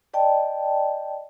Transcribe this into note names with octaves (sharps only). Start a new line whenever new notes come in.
D5 D#5 G5 A5